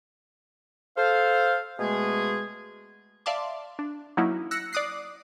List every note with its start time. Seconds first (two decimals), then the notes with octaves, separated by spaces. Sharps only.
0.97 A4 C5 F5
1.80 B2 G#3 A3 G#4
3.26 D5 E5 F5 A5 C6 D6
3.79 D4
4.17 F#3 A#3 C#4 D#4 E4
4.51 E6 F#6 A#6 C#7
4.73 D5 D6 D#6 F#6 C7